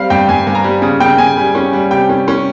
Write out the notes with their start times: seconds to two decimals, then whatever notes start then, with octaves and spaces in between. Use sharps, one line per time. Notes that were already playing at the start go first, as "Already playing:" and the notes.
Already playing: G3 C4 F5
0.10 G2 G5
0.28 G2 G#5
0.47 G2
0.55 A#5
0.64 G3
0.82 C#3
1.00 C#3 G5
1.18 C#3 G#5
1.37 G3
1.55 C#4
1.73 G3
1.91 C3 G5
2.09 C#4
2.28 C#4